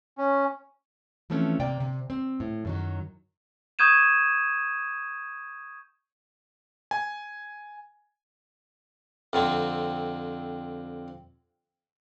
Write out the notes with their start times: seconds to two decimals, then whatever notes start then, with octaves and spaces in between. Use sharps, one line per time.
0.18 C#4
1.30 E3 F3 A3 C4 C#4
1.60 C3 A#3 D5 G5
1.80 C3
2.10 C4
2.40 A2
2.65 F#2 D#3 F#3
3.79 C#6 D#6 G6 G#6 D#7 E7
6.91 G#5
9.33 F2 D3 C4